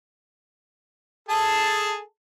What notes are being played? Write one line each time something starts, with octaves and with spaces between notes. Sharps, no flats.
G#4 A4 A5